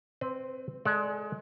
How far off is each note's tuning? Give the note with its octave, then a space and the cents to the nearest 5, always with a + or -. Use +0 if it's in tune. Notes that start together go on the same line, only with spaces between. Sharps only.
C4 +0 B4 +30
G#3 +20 A4 +0 D5 +0